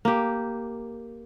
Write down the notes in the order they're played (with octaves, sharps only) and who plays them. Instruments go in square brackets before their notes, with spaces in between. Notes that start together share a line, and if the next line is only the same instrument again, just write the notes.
[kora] A#3 G4